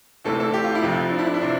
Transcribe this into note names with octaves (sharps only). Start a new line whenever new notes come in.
D2 C3 E3 A4
A4
G4
F4
E4
F2 C3 F3 F4
D4
E4
D4
E4
C3 E3 D4